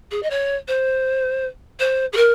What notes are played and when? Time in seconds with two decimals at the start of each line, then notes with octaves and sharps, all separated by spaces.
0.11 G#4
0.22 D#5
0.30 C#5
0.68 C5
1.79 C5
2.13 G#4
2.17 A#4